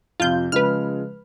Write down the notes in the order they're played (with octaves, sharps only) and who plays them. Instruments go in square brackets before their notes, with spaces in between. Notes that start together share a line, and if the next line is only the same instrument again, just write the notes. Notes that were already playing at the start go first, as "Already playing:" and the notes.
[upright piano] F2 C3 [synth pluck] F4 G6
[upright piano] C#3 F3 G#3 [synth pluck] B4 F6